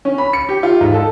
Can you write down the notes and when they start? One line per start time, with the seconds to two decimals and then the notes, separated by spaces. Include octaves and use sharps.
0.05 C#4
0.18 B5
0.33 C#7
0.49 G4
0.63 F4
0.81 G#2
0.94 A4